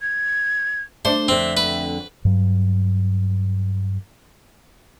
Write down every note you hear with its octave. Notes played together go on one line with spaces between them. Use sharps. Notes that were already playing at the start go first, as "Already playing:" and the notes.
G#6
A3 D4 C5
F2 D3 C4 E5
B4
G2 F#3